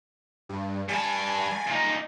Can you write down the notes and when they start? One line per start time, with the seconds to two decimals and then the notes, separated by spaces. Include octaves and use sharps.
0.49 G2
0.89 G3 G#5 A5
1.67 A#2 D#4